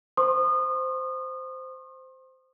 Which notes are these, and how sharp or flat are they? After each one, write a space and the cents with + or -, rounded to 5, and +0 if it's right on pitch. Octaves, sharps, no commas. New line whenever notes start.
C5 -10 C6 +40 D#6 -30